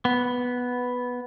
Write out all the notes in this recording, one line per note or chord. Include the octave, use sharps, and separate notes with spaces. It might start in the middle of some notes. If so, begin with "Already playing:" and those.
B3